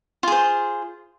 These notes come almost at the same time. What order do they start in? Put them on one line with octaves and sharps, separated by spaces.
F4 G#4 C5